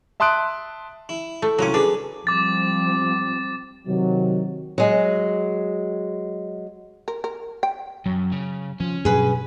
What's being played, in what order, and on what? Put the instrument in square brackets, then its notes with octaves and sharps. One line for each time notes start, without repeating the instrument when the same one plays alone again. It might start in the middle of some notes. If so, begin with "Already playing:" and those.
[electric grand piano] E5 A5 C6 D#6 F#6 D7
[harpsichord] E4
[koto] A3
[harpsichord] C2 F4 D6 [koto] F#3 C#4
[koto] D4 [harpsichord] G#4 B4
[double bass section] F3 G3 C4 [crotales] D6 A6
[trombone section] C3 D#3 F#3
[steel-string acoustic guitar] F#3 G#3
[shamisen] A#4
A#4
G5
[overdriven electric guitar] F#2 [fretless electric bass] F#3
[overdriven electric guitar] C#3
[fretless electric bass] F3 [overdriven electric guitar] C#4
[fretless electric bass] G2 B2 F#3 [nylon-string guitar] G#4 B4